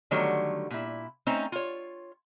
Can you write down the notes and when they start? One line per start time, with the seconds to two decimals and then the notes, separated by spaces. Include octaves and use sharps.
0.11 D3 D#3 F#3 G3 A3 C#5
0.70 A#2 E4
1.26 A3 C4 C#4 D#4 C5 A#5
1.52 F4 C#5